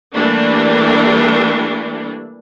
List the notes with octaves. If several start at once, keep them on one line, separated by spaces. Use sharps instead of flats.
E3 G3 A3 A#3 D4